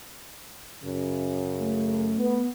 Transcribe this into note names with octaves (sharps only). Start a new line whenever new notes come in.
F#2 C#3
A3
B3